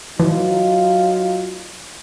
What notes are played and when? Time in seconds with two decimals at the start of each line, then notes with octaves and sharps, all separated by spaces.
0.20 E3 F#3 D#4 F4